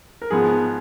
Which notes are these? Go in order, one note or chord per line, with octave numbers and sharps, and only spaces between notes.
A#4
G#2 F3 B3 G#4